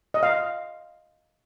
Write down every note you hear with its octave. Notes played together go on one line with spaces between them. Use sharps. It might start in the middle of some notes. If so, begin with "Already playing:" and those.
D#5
F5